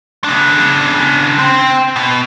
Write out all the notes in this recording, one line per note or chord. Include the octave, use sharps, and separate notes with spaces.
C#3 D4
C4 G5
B2